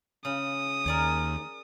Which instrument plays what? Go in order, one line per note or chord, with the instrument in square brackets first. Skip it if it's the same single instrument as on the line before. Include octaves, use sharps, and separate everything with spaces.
[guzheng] C#3 [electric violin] D#6
[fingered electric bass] D#2 [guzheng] A#4 D5 G#5